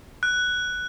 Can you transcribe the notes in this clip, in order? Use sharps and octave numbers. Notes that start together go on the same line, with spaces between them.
F#6